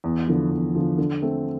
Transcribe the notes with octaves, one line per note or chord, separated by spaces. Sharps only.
E2
D3 F3
E2
D3 F3
D3
A3 C4